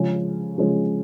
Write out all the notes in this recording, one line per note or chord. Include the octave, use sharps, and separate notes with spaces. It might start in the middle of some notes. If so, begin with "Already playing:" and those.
Already playing: C#3 F3 G#3 C#4
C#3 F3 G#3 C#4